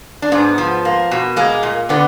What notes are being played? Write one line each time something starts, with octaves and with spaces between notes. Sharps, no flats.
D4
G#2 B3
F3
A#3
B2
G#3 A#3
A#2
D3 B3